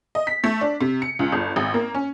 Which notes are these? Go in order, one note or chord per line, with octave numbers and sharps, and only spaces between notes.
D#5
B6
A3
D4
C3
C#7
C#2
G1
G#1
A#3
C#4